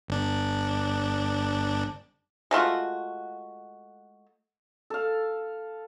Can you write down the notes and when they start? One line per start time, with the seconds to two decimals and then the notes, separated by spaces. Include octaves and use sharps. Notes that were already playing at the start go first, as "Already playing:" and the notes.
0.08 G1 D4
2.51 G#3 A3 F4 F#4
4.90 A4 F5